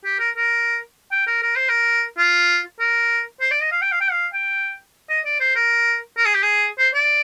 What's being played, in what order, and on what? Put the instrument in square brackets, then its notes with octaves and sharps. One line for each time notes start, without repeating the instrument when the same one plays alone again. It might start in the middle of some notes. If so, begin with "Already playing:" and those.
[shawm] G4
A#4
A#4
G5
A#4
A#4
C5
A#4
F4
A#4
C5
D5
D#5
F5
G5
F5
G5
F5
G5
D#5
D5
C5
A#4
A#4
G#4
G4
G#4
C5
D5